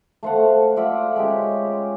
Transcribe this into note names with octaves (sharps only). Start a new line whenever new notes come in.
A3 C5 F5 F#5
F4 D5 E5 F#5
G#3 C#4 G4